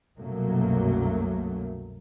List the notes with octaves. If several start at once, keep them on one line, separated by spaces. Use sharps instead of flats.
C2 F#2 B2 F#3 A3 A#3